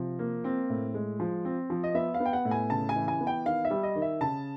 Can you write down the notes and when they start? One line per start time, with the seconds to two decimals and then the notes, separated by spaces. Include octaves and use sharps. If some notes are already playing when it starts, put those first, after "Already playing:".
Already playing: C3 F3
0.19 A#3
0.44 C4
0.69 A2
0.94 G#3
1.20 F3
1.45 C4
1.70 F3
1.84 D#5
1.95 B3 E5
2.14 F5
2.20 B3
2.26 G5
2.33 F#5
2.45 A2
2.51 G#5
2.70 C#3 A5
2.89 G#5
2.96 E3
3.08 G#5
3.21 B3
3.27 G5
3.45 D#3 F5
3.65 E5
3.70 G3
3.83 D#5
3.95 D#3
4.02 E5
4.21 C#3 A5